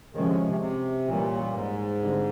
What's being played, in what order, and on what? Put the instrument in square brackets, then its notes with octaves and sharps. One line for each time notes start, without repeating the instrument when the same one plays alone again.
[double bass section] C3 F3 G#3 C#4 [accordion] D#3
[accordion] D3
C3
C3
[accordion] A#2 [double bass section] E3 G3 A#3 C#4
[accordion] G#2
[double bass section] D3 G3 C4